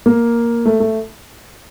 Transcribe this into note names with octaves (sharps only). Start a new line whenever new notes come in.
A#3
A3
A3